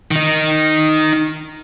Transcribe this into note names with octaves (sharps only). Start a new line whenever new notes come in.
D#3 D#4